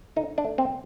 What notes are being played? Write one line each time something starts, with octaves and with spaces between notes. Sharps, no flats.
D3 D#4
D4
A3
C4